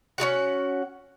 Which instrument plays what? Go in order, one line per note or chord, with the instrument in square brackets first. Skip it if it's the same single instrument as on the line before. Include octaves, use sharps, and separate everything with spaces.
[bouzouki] C#4 D#4 F#4 F#5